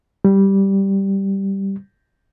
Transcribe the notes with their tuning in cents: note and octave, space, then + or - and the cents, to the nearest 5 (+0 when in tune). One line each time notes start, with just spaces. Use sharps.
G3 -5